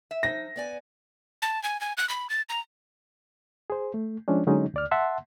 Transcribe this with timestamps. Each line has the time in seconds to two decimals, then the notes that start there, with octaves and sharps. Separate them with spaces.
0.11 E5
0.23 F3 D#4 A#6
0.56 B3 D5 G#5
1.42 A5
1.63 G#5
1.81 G#5
1.97 F#6
2.09 B5
2.30 A6
2.49 A#5
3.70 G#4 C5
3.94 A3
4.28 F3 G#3 C#4 D4
4.47 D3 F#3 G#3 C#4 D#4
4.74 D2 D5 F6
4.91 E5 F#5 A5 C6